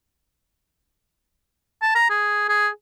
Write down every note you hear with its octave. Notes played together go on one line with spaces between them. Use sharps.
A5
A#5
G#4
G#4